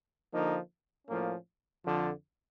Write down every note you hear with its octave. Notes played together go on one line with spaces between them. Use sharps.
D3 F3 A#3 D#4
A2 F3 A#3 C#4
F2 D3 F3